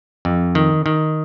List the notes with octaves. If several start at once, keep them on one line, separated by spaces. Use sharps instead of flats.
F2
D#3
D#3